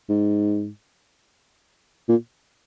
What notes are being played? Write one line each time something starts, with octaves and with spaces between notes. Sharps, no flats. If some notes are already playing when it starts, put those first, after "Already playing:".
G#2
A#2